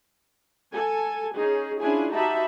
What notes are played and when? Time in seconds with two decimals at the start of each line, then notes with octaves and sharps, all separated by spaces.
0.74 A4 G#5
1.35 C#4 D#4 G#4
1.81 C#4 D4 E4 F4 G#4 G#5
2.13 D#4 F#4 G4 E5 A5 B5